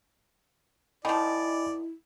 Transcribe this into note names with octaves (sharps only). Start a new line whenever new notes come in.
D#3 F3 E4 D5 D#5 G#5 B5